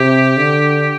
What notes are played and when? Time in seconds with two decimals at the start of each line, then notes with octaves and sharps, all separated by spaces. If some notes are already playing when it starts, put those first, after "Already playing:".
Already playing: C3 G4
0.37 D3